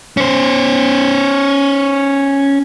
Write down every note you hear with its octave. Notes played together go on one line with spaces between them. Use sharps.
C#4 C5